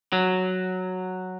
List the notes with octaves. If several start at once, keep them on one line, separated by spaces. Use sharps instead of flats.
F#3